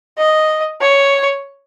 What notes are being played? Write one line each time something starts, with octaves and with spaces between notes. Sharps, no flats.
D#5
C#5